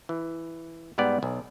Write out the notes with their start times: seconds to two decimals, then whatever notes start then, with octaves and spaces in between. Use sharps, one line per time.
0.09 E3
0.98 G#2 G3 B3 D5
1.23 B1